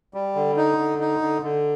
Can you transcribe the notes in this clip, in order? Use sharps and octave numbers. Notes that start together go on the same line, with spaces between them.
G3
D3
D#4
D3
D#4
D3
D3